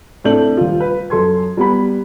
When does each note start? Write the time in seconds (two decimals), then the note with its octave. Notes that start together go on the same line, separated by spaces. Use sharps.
0.24 A2 C4 D4 A4 G6 F#7
0.57 D#1 F4
0.80 B4
1.10 F#2 A4 C6 G#6
1.57 G3 B3 B5